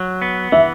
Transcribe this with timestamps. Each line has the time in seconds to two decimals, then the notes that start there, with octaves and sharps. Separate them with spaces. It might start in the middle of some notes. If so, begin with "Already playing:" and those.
Already playing: F#3
0.22 B3
0.52 E3 E5